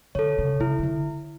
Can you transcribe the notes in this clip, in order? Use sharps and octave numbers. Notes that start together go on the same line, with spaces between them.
D3 A4 C#5
C#3
C#3 E4
D#3
D3